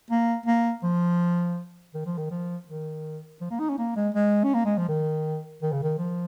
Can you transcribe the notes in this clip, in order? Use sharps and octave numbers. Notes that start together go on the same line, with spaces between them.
A#3
A#3
F3
D#3
F3
D#3
F3
D#3
F3
A#3
D#4
C#4
A#3
G#3
G#3
C#4
A#3
G#3
F3
D#3
D#3
C#3
D#3
F3